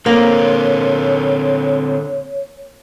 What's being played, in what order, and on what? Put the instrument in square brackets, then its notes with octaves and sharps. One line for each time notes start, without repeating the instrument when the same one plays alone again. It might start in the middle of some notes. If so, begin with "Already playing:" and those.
[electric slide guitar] D3 C4 [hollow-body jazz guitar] A#3 [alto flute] C#5